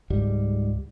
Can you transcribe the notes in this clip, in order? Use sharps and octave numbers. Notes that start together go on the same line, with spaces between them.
C#2 G#2 G3